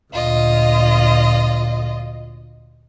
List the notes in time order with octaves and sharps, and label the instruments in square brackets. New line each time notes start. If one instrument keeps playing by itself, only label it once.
[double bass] D2 A#2 [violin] F4 D#5